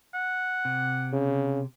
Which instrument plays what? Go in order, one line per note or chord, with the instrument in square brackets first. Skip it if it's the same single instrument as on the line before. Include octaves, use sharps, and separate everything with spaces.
[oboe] F#5
[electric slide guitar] C3
[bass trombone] C#3